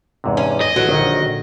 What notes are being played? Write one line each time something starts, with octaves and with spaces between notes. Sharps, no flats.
E2 G#2 C3
C#4
D5 D#5
A1 F#3 D#4 F#4 G#4
A#1 A#2 D3 D#3 F#4